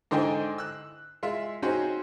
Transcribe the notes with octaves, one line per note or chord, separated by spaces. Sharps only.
G#2 D3 C5 D#5 G5 G#5
E6 F#6
G#3 F4 E5
C4 C#4 D#4 F#4 G#4 C5